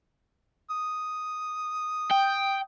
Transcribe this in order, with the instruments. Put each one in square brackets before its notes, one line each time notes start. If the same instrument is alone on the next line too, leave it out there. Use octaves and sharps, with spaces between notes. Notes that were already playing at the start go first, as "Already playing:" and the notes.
[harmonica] D#6
[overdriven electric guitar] G5